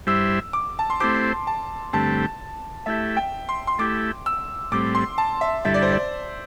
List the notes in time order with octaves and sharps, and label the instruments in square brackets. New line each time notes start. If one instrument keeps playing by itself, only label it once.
[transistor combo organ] G2 G3 E4 C5 E5 [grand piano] E6
[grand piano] D6
A5
C6
[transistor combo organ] A3 C4 E4 G4 C5 [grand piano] D6
[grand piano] A5
[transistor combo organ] G2 D3 A3 C4 G4 [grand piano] A5
[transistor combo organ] A3 E4 G4 [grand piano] E5
[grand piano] G5
C6
C6
[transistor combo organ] A3 E4 G4 [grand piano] D6
[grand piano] E6
[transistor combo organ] A2 G3 C4 [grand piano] D6
[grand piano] C6
A5
E5
[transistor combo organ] G2 D3 G3 E4 A4 [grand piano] E5
[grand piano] D5
C5
D5